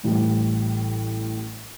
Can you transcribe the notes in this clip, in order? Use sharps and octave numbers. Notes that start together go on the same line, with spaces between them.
A1 A2 E3 G3